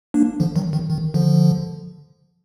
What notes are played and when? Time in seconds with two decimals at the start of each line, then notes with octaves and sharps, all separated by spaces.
0.14 A#3 D4
0.40 D3 F3
0.56 D#3 F#3
0.73 D#3
0.90 D#3
1.14 D3 F3